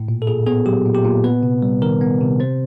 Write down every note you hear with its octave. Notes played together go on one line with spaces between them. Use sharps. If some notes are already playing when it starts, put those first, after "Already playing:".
Already playing: A2
A#2
A4
A#2 G#4
B3 G#4
F#3 G4
A#2
G4
A#2
B3 B4
C3
G3
D#3 A#4
B3
C3
C4 C5